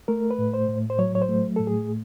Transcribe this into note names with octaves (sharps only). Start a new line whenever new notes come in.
A3 A#4
B4
A2
C5
A2
C5
F#3 C#5
C#5
C5
A3
A2 A4
G#4